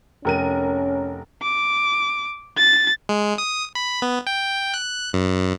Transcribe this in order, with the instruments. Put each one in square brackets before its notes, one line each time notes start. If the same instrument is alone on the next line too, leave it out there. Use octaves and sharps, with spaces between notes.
[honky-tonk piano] F1 A#4 D#7 [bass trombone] C#4
[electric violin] D6
A6
[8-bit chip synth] G#3
D#6
B5
B3
G5
F#6
F#2